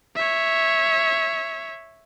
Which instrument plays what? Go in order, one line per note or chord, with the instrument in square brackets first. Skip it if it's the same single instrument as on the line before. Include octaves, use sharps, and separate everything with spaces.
[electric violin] C#5 E5